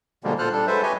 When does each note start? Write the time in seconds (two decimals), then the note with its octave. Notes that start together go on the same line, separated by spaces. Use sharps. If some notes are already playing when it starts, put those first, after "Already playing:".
0.24 B2 D3 F3 G3 G#3 A#3
0.39 A#2 F4 A4 C5 F6 F#6
0.52 G3 D4 A4
0.67 F#3 G#3 A4 B4 C5 E5
0.83 G4 B4 C#5 D#5 E5 G#5